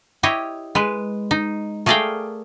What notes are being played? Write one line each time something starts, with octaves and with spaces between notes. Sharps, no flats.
E4 G4 C#5 D#5
G#3 B4
D#4
A3 G#4 A#4 D5 F5 G5